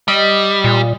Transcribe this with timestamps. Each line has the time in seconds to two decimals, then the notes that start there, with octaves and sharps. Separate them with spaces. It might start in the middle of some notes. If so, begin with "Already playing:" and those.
0.08 G3 D#5
0.64 A#2